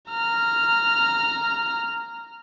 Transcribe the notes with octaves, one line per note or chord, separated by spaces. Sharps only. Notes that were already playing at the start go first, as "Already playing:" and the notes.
A#5 F6